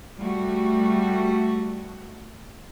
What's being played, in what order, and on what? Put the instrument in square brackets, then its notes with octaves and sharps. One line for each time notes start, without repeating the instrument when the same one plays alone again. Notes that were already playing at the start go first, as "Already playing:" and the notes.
[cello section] G3 A3 F#4